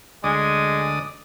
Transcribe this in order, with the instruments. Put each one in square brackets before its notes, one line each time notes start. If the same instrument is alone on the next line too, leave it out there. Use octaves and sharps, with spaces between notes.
[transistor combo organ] D2 D5 D#6 [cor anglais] G#3